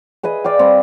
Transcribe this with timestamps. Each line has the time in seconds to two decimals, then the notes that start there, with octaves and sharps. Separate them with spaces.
0.23 G#4 B4 D#5 E5
0.44 D5 F5 G5
0.59 G3 C4